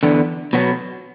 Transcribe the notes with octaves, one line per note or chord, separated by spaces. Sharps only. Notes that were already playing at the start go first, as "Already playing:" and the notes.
E2 D3 B3
B2 F#3 B3